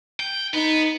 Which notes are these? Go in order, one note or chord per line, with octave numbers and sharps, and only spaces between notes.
G5
B3 D#4